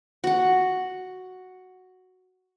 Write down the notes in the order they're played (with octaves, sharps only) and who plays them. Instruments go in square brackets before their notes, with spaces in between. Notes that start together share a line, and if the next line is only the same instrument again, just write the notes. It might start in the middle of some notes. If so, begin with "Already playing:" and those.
[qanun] F#4 F#5